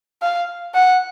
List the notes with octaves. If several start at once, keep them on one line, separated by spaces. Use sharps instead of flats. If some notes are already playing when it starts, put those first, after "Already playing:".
F5
F#5